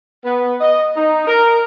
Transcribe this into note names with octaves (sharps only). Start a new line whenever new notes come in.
B3
D#5
D#4
A#4